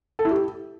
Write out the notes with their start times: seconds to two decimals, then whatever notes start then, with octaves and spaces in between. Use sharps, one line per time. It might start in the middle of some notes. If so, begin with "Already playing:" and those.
0.19 A4
0.25 E4
0.31 G4